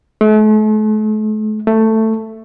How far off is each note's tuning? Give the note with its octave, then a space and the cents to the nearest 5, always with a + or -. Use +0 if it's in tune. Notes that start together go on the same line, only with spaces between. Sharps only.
A3 -40
A3 +10